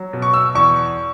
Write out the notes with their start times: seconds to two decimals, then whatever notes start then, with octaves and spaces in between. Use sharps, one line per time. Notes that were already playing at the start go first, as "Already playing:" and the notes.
Already playing: F#3
0.13 B2
0.22 C#6
0.34 E6
0.55 E2 C#6